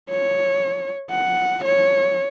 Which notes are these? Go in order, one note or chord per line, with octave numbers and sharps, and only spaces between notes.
C#5
F#5
C#5